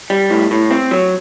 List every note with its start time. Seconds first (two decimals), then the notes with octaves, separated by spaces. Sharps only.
0.10 G3
0.30 A2
0.51 A2
0.71 C4
0.91 F#3